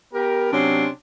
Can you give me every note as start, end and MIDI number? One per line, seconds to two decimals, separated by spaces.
0.13 0.51 59
0.13 0.51 67
0.13 0.51 70
0.52 0.87 48
0.52 0.87 54
0.52 0.87 61
0.52 0.87 62
0.52 0.87 84